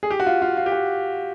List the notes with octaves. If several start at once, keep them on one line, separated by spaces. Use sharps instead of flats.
G#4
G4
F#4
F4
F4
F4
G4
F#4